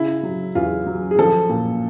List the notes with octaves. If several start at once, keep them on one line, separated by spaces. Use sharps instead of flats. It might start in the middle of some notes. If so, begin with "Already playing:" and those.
Already playing: C#3 E4
F#3
E2 F4
F#3
G#4
F3 A4
A#2